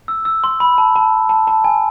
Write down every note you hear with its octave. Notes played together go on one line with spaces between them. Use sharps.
E6
E6
C6
B5
A5
A5
A5
A5
G#5